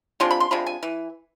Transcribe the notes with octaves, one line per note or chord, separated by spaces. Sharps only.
C3 G#3 D4 F4 C6
B5
C6
C3 G#3 D4 F4 B5
G#5
E3